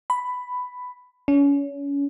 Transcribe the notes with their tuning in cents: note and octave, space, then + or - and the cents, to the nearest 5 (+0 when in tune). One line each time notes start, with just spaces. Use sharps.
B5 +10
C#4 +30